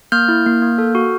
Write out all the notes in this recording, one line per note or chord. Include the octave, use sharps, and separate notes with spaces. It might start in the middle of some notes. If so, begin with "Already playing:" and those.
A#3 F6 G6
E4
A#3
A#3
A4
F#4